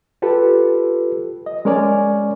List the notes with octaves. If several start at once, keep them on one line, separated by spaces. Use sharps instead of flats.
F4 G4 A4 B4
D#5
G#3 C#4 A#4 C#5 D5 G#5